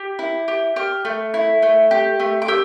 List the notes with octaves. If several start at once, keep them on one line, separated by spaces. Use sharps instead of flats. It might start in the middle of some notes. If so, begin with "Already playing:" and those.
Already playing: G4
E4
G4
G4 F6
A3
E4
A3
G4
A3
D6
G4 E6